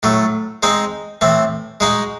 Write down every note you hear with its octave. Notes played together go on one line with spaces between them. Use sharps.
A2 F#3 A3
G#3 C4 D#4
A2 E3 C4
G#3 D#4 F#4